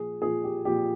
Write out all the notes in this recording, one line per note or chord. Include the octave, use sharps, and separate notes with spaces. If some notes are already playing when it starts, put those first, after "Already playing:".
Already playing: A#2 F3 G#4
A#2 F3 G#4
G4
A#2 F3 G4